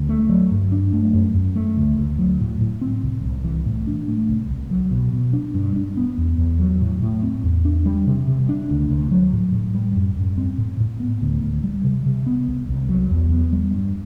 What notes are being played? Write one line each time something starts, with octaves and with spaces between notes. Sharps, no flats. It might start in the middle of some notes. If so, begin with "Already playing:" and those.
Already playing: D2
A3
F#3
G2
D4
A3
F#2
F#2
A3
D2
D2
F#3
A2
A2
C4
C2
C2
E3
A2
D4
A3
C2
C2
F#3
B2
B2
D4
G2
D4
B3
E2
E2
F#3
A2
A2
C4
E2
D4
G3
C3
C3
D4
D2
D2
F#3
A2
A2
G3
F#2
F#2
C4
A2
A2
B3
D2
D2
G3
C3
C3
B3
C2
C2
F#3
E2
B3
G3
G2